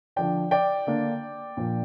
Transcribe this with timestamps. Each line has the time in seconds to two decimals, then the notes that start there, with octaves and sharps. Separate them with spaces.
0.16 D3 F3 D4 D5 G5
0.51 D5 G5
0.87 D3 A#3 D4
1.57 A#2 F3 D4